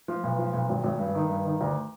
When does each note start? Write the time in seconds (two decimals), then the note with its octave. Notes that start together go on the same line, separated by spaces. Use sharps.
0.08 F3
0.23 B1
0.39 F3
0.53 B1
0.69 G#1
0.83 G#1
0.99 G2
1.15 D#3
1.29 G2
1.45 D#3
1.61 D2